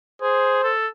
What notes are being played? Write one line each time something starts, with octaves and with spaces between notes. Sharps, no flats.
G#4 C5
A4